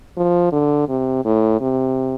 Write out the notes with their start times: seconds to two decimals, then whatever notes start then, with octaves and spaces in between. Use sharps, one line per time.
0.17 F3
0.52 D3
0.89 C3
1.25 A2
1.61 C3